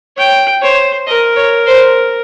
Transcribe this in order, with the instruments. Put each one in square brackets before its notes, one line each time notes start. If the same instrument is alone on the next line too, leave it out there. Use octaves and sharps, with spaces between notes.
[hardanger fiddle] C#5 [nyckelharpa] G5
[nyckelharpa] C5 [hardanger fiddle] C#5
[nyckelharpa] A#4 [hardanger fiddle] D#5
[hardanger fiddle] C#5
C5